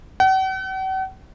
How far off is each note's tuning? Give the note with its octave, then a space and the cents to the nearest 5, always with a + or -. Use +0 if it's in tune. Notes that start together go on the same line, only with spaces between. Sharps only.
F#5 +45